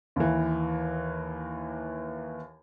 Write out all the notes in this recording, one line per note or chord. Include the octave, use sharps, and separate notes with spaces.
D#2 E3